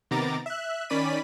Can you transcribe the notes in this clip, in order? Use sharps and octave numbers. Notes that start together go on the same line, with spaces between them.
C3 D#3 B3 A#5 D6 A6
E5 F#6
D#3 C#4 D5 B5 B6 D#7